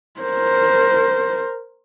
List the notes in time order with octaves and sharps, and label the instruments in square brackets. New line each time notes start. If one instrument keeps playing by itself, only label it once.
[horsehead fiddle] A#4 C5